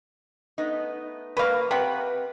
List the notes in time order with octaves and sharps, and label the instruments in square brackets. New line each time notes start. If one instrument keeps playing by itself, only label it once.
[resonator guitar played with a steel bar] A3 B3 D#4
[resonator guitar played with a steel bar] F#3 A#3 A#4 [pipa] B4 F5
[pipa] C3 [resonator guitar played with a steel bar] B4 F#5 G5